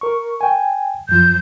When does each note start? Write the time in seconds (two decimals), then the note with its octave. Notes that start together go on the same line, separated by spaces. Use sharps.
0.01 A#4 C#6
0.41 G5 G#5
1.09 F#2 F3 G6